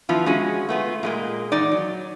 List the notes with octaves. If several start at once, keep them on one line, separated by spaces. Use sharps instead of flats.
F3 B3 E4 F4
G#3 C#4 F#4 G#4
A3 B3 F4
A#2 G#3 A#3
E2 D#4 D5
F#3